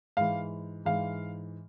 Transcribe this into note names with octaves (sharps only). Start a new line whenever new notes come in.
G#2 E3 F5
G#2 E3 F5